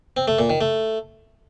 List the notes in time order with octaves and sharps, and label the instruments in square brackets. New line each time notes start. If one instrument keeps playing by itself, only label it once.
[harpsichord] C4
A3
A#2
D#3
A3